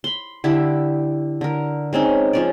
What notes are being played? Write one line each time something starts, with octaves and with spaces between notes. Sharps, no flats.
B5 C6
D3 E4 G4
D3 A#4
G#3 C4 C#4 D#4
F3 C#4 D5